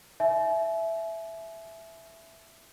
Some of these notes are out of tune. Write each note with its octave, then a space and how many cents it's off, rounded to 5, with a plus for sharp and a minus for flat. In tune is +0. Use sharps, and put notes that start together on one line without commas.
E5 +0 G#5 +45